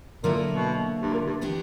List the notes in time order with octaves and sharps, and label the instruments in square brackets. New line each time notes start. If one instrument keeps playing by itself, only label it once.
[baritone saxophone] A#2 [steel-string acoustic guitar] D3 F#3 A#3 E4
[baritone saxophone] B2
G2
A#2
G2
[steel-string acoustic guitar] E3 B3 D4 G4